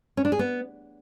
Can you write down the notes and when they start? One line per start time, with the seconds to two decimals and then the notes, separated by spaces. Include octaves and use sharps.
0.17 C#4
0.25 D4
0.32 G#4
0.39 B3